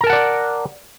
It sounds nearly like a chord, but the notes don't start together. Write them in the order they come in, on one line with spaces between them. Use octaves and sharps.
A#5 A#4 A5 F#5 D5